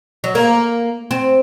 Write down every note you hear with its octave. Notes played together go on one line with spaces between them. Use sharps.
F#3
A#3
C4